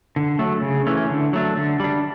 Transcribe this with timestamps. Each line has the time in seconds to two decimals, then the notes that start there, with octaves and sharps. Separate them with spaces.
0.16 D3
0.39 F#3 A3
0.62 C#3
0.87 E3 A3 C#4
1.10 D3
1.33 F#3 A3 D4
1.57 D3
1.80 G3 D4